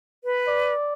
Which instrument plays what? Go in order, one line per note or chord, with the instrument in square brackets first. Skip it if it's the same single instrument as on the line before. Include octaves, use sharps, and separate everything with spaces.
[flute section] B4
[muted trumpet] D5